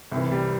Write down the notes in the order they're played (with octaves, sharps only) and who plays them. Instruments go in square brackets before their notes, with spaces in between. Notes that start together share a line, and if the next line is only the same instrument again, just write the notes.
[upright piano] C2 C3 E3
G3